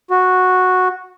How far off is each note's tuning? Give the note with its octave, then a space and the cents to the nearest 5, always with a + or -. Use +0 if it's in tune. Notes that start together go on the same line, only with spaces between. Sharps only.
F#4 -5